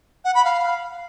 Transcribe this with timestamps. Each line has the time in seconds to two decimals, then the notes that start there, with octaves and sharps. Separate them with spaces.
0.25 F#5
0.35 B5
0.45 F5